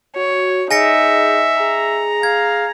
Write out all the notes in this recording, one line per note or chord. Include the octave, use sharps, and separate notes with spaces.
F#4 C#5
D#4 G#4 E5 G#5 A#6 C#7
G#4 A#5
F5 G#6